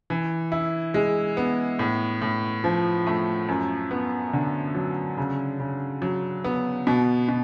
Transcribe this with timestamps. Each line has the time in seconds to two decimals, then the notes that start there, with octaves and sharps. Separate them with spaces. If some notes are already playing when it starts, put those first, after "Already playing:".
0.10 E3
0.52 E4
0.94 G#3
1.37 B3
1.79 A2
2.22 A2
2.64 F3
3.07 A3
3.48 F#2
3.91 B3
4.33 D3
4.75 F#3
5.17 C#3
5.60 C#3
6.02 F#3
6.44 B3
6.87 B2
7.28 B2